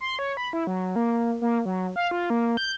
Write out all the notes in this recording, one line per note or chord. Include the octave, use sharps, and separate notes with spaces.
C6
C#5
B5
E4
F#3
A#3
A#3
F#3
F5
F4
A#3
G6